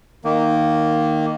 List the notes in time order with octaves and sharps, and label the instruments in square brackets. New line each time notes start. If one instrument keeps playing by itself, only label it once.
[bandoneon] D#3 A#3